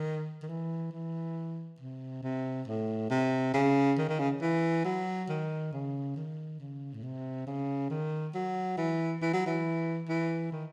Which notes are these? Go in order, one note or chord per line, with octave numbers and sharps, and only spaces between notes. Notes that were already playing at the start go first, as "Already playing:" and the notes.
Already playing: D#3
D#3
E3
E3
C3
C3
A2
C3
C#3
D#3
D#3
C#3
E3
F#3
D#3
C#3
D#3
C#3
A2
C3
C#3
D#3
F#3
E3
E3
F#3
E3
E3
D#3